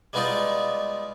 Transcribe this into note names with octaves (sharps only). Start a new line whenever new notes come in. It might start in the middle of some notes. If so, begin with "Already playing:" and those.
G3 G#3 B3 D#4 F4 D5